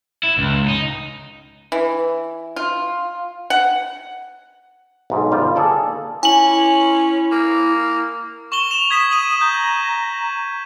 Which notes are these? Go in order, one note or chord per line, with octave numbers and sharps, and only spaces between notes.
E4
C#2
D#4
E3
F4
F#5
B1 G#2
G1 G3 F4 C5 F5
A#3 G#4 A4 D5
C#4 E4 G#5 F#7
A#3
C#6 E7 F#7 G7
E7 F7
D#6 G#6 B6 E7
D#7 F#7
A#5 G6